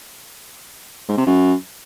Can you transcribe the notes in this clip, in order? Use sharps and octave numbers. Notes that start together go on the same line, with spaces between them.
G#2
C3
F#2